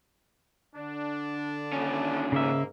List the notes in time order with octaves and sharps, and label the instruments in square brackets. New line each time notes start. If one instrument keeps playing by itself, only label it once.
[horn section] D3 D4
[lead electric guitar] D#2 C#4
[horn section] G#2 A#3 [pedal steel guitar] C#3 E5